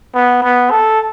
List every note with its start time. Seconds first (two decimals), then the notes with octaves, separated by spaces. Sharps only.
0.15 B3
0.43 B3
0.71 A4